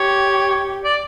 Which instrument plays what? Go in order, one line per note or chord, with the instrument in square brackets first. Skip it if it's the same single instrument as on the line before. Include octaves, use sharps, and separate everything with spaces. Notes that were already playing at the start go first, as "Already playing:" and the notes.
Already playing: [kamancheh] G4 [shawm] C#5
[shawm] D5